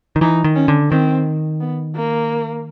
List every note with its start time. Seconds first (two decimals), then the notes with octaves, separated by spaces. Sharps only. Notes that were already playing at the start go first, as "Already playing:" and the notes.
0.16 D#3
0.21 E3 D#4
0.44 D#3
0.56 C#4
0.68 D3
0.91 D#3 C4
1.61 B3
1.95 A#3